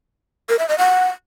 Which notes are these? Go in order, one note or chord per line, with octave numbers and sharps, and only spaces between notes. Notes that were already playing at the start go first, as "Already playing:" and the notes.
A#4
E5
D#5
F#5